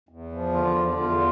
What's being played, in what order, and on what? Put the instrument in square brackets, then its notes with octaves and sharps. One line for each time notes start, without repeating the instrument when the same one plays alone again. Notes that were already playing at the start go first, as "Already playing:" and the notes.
[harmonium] E2
F3
D3 F4
E2
E2 F4